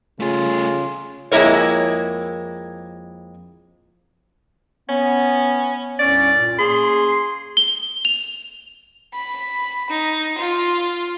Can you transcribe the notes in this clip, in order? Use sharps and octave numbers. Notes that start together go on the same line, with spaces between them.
C#3 A3 F4 G#4
F2 G#3 A#3 E4 A#4 C#5
B3 C#4
C2 G2 C#4 D5
A#2
A#3 C#4 G#4 C6
G7
F7
B5
D#4
F4